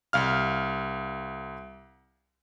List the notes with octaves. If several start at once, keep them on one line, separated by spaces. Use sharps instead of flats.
C2 F5 F6